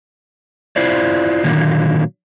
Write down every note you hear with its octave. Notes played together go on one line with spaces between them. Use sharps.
E4 F4 C5 D5
A#2 D3 D#3 F#3 A#3